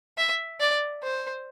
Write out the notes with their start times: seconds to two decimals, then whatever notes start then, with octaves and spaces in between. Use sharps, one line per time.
0.18 E5
0.60 D5
1.03 C5